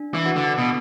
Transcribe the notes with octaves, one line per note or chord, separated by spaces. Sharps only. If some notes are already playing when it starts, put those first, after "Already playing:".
Already playing: D4
E3
F#4 B4 F#5
D3
B2 B3